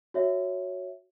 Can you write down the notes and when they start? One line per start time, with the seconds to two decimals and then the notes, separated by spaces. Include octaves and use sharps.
0.14 F#4 C#5 E5